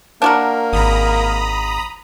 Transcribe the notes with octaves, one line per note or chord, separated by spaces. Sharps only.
A#3 D4 F#4 A#4
G#1 A#5 B5 D#6